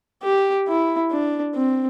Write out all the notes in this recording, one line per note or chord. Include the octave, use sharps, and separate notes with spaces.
G4
E4
D4
C4